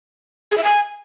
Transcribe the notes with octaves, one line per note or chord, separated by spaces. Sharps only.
G#4
E5
G#5